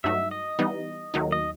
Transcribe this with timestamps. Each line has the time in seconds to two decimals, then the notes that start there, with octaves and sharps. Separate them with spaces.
0.04 G2 F#3 A3 D#4 F#4 E5
0.31 D#5
0.59 E3 G3 B3 D#4
1.14 D#2 D#3 F#3 A3 D#4
1.32 D#5